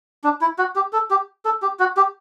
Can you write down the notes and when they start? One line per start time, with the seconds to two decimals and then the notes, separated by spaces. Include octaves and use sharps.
0.24 D4
0.41 E4
0.58 F#4
0.75 G4
0.93 A4
1.10 G4
1.45 A4
1.62 G4
1.79 F#4
1.97 G4